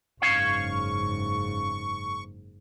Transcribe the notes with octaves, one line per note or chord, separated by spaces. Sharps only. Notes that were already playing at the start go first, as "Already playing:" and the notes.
F#1 G#2 C#4 C#5 F5 C#6